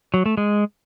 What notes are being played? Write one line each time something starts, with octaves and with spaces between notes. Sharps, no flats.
F#3
A3
G#3